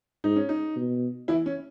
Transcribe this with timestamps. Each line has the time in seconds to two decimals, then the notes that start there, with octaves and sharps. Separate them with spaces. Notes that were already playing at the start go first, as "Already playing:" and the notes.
0.24 G#2 D#4
0.36 C#4
0.49 D#4
0.76 B2
1.28 E3 E4
1.46 C#4